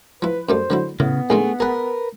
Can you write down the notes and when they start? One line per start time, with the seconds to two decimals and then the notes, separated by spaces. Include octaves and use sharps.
0.22 F3 E4 B4
0.49 F#2 G3 A3 C5
0.70 D3 F#3 E4
1.00 A2 C#3 B3
1.30 A#1 D#3 G#3 A3 G#4
1.60 G#4 A#4 B4 F#5